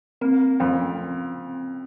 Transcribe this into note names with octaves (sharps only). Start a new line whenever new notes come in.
A#3 C4
F2 C#4